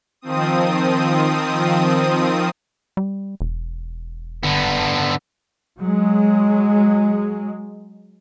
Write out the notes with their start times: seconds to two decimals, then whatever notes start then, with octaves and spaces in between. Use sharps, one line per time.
0.21 D#3 F3 C4 D#6
2.97 G3
3.41 E1
4.43 D3 B3
5.79 F#3 G#3